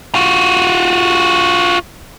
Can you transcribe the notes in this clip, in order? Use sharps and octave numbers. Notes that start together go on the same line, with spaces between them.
F4 F#4